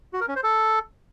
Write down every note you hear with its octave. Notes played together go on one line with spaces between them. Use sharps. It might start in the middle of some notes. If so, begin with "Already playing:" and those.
F#4
A#4
C#4
C5
A4